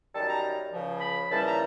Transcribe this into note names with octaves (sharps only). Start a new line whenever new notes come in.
F#2 D#3 G3 A5
A#5
C#2 C#3 F3
B5
D#2 C#3 E3 G3 A5
A#5